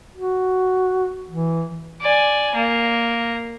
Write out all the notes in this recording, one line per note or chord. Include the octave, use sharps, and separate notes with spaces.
F#4
E3
D5 G#5
A#3